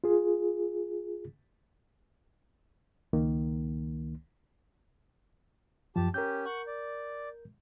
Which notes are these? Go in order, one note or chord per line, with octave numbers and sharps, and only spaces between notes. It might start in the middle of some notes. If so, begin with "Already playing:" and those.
F4 G#4
C#2 D#3 A#3
F#2 F3 G4 A5
C#4 G4 A#4 G6
F#5 C#6
D5